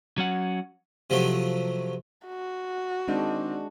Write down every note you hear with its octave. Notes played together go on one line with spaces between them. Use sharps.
F#3 C#4 F#5
C3 F3 F#3 A3
F#4
D#3 G#3 C4 D4 D#4